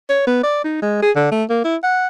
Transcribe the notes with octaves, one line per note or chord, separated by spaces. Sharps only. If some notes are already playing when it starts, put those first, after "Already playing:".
C#5
B3
D5
D#4
G#3
G#4
D3
A3
A#3
E4
F#5